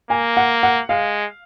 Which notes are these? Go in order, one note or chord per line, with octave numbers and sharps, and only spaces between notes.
A#3 G#5
F#5
F#5
G#3 F5